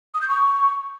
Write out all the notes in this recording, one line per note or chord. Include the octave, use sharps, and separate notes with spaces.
D#6
G6
C#6